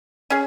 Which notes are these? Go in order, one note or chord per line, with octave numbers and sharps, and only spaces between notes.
C#4 G#4